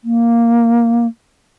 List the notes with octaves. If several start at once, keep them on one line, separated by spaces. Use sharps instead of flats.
A#3